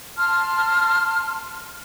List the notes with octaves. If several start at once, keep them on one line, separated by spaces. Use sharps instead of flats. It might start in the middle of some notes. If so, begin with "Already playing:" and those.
A5 C6 F6